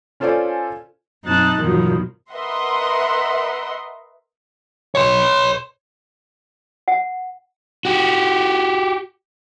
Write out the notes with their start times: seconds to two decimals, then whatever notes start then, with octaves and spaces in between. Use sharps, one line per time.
0.20 C#4 F4 A4 C5 D5 G#5
1.24 F#2 B2 C4 D#4 A5 F#6
1.59 E2 G2 B2 D#3 F3 F#3
2.32 A#4 B4 D#5 E5 F#5 C6
4.95 C#5 C6
6.88 F#5
7.85 F#4 G4